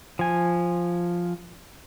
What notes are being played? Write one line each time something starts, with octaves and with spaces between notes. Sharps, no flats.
F3 G#5